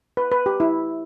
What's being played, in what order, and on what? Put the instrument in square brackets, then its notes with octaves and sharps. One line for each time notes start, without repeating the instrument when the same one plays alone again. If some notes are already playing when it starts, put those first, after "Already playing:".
[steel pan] B4
B4
G4
E4